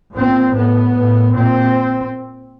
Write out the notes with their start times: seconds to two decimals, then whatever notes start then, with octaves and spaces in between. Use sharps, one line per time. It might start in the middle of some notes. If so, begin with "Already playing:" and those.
0.15 A#2 C4
0.54 A2 B3
0.94 A2
1.33 A#2 C4